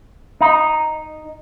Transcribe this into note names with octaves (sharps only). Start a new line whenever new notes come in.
D#4